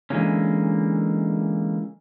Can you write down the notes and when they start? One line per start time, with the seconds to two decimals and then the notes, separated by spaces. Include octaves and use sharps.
0.10 D3 E3 G#3 A#3 C#4